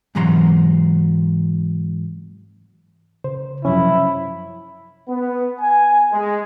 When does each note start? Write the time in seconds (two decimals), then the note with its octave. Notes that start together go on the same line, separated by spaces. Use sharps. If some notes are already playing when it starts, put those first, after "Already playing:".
0.15 G#2 C3 E3 F#3 A#5 C6
3.24 C#3 C5
3.65 F#2 C3 F3 F#3 C#4 E4
5.09 B3
5.60 G#5
6.12 G#3